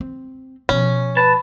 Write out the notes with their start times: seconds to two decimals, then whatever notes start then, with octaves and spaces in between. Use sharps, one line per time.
0.01 C4
0.69 B2 F3 C#4
1.17 B4 A5